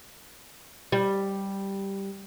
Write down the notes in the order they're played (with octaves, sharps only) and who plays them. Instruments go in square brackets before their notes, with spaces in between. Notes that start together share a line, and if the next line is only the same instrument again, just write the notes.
[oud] G3